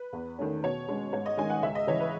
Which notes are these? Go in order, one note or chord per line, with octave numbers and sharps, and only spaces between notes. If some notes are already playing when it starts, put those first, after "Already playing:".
Already playing: B4
E2
D#3 A3 C#4
B2 C#5
G#3 C#4
G#2 C#5
D#5
D#3 G#3 C#4 G#5
F#5
C#2 E5
D#5
C#3 E3 C#5
B4